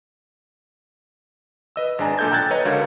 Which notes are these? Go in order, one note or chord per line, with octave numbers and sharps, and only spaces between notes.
B4 D#5 E6
G#1 G#3 D4 G#5 A#5
B1 A#2 A4 G#5 G6 G#6
G5 A#5 E6 F#6 G#6 A6
B4 C#5 D#5 A#5
C#2 D3 F#4 A#4 F5 G#6